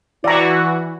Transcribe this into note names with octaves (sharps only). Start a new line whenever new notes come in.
E3 E4 F#4 D5 A#5